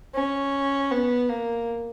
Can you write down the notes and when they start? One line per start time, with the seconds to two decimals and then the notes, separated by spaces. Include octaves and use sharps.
0.15 C#4
0.92 B3
1.29 A#3